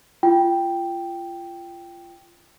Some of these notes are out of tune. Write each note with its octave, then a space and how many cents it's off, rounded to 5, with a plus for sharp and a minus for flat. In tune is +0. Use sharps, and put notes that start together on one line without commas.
F4 -25 G5 +0